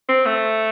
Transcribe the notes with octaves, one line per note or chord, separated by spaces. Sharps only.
C4
A3